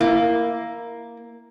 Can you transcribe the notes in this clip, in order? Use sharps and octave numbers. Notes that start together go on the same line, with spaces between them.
A#3 E4